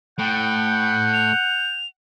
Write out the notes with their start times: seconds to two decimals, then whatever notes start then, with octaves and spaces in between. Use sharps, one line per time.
0.18 A2 F#5 G5 G6
1.14 F7